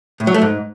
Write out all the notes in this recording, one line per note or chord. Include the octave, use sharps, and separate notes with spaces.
A2
F#3
A3
G#2